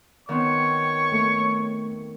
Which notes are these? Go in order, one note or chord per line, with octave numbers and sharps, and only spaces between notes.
D#3 B3 C4 C#5 C#6
A3